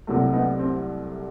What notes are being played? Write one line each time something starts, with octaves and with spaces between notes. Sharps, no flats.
C2 C3 F#3 A3
B3 D#4
C4